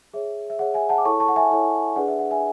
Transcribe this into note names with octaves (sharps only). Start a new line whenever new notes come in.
G#4 C#5 E5
E5
G#4 C#5 F#5
E5 G#5
F#5 A5
D6
E4 A4 C#5 A5 C#6
A5 C#6
F#5
E5 G#5
E4 A4 C#5
D4 G#4 B4 D5 F#5
E5
F#5
E5 G#5